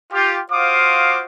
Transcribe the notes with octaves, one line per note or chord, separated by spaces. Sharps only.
F4 G4
F4 F#4 C5 F5 D6 D#6